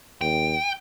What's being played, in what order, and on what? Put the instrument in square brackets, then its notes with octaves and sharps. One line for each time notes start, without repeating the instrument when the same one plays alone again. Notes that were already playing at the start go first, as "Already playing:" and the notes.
[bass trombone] D#2 [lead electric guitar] G5